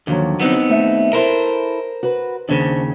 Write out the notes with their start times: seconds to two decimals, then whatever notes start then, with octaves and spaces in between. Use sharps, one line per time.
0.07 D#2 D3 F3 F#3
0.40 B3 C4 D#4
0.68 D#2 A3 E5
1.13 E4 A4 A#4 C5
2.03 F#4 B4
2.49 D#2 C#3 D4 C5